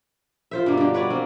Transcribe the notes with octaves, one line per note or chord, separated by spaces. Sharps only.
F4 C5 E5
G2 B2 A#3
D3 G4
F#4 B4 C#5 D5
A#3 C4